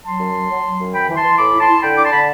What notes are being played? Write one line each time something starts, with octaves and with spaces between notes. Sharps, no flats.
F#3 A5 C6
F#2
F#3
F#3
F#3
F#2
E3 G5 B5
E3
A5 C6
E3
A2 B5 D6
E4
A5 C6
E4
D3 G5 B5
D4 D6
A5 C6
D3 B5